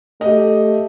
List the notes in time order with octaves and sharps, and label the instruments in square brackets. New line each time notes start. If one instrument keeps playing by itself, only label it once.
[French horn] A3 [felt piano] G4 D#5